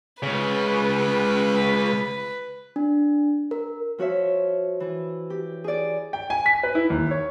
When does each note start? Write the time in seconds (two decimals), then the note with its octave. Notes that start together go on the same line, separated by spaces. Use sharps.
0.23 C#2 C#3 B4
2.76 D4
3.51 A#4
3.98 F3 F#4 C#5 E5
4.80 E3
5.30 G4
5.64 G#4 D5
6.13 G5
6.30 G#5
6.46 B6
6.63 B4
6.75 E4
6.90 D#2
7.11 C#5